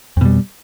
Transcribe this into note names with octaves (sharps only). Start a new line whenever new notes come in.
F2 B2 G3